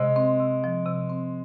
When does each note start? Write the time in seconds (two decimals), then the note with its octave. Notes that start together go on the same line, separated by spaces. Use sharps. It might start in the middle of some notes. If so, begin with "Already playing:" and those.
Already playing: C3 G#3
0.16 C4
0.40 C3
0.64 F3
0.86 C3
1.09 C4